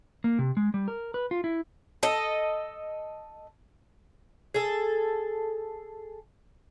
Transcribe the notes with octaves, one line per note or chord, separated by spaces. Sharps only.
A#3
C3
G#3
G3
A#4
B4
F4
E4
A4 D#5
G#4 A4